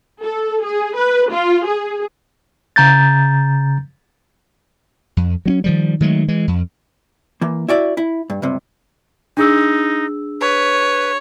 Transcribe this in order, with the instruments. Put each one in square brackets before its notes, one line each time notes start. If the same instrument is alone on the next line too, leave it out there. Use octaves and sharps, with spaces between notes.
[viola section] A4
G#4
B4
F4
G#4
[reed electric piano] C#3 A#5 G6 A6
[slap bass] F2
F#3 C4 C#4
D#3 F3 G3
D#3 F#3 G#3 A3
E3 G#3
F2
[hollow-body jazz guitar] E3 A#3
E4 F#4 D5 E5
E4
G2
C#2 G2 C3
[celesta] D4 G#4 E6 [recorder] D#4
[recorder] B4 [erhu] C#5